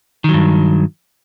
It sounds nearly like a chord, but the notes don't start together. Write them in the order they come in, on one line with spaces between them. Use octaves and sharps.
D#3 F#3 G2